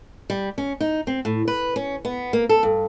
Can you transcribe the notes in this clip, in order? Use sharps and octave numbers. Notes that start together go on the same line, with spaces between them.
G3
C#4
D#4
C4
A2
B4
C#4
B3
A#3
A4
G2